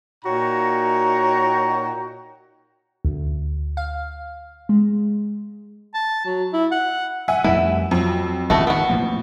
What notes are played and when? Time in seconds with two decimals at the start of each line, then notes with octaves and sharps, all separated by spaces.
0.25 A#2 D#4 F#4 C#5 G5 A#5
3.05 D2
3.77 F5
4.69 G#3
5.94 A5
6.26 F#3
6.53 E4
6.71 F#5
7.28 E5 F#5 G#5
7.44 F2 G3 A3 E4
7.91 F2 F#3
8.50 G#1 C#2 A3 B3 F#4
8.67 D#3 B3 F#4
8.90 A2 F3 A#3